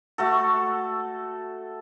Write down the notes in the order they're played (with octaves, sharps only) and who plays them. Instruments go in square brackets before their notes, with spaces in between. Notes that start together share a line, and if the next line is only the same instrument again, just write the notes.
[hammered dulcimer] A3 F#4 A4